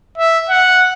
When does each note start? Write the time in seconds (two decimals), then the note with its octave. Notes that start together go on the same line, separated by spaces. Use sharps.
0.18 E5
0.50 F#5